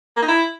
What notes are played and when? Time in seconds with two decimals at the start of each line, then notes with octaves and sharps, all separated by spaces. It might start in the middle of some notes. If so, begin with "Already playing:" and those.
0.17 A#3
0.22 D#4
0.28 E4